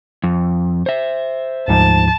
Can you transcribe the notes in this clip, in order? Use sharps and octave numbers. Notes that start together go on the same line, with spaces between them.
F2
C5 E5
D2 G#2 F3 A5